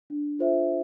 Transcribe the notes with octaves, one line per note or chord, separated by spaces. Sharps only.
D4
F4 A4 C5 E5